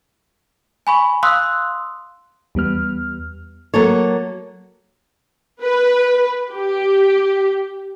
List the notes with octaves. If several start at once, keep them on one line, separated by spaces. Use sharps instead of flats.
G#5 B5 C#6
F5 C6 D#6 E6 F#6
E2 G3 B3 F6
F#3 A#3 A4 C#5
B4
G4